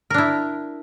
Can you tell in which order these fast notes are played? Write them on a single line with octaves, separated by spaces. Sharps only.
A#4 D4 E4